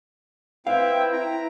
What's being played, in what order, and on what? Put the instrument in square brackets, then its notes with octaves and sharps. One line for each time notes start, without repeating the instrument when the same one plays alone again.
[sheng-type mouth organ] C4 E4 E5 [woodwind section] B4 G5 [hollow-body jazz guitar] F5
[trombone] E4 [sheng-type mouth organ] A#5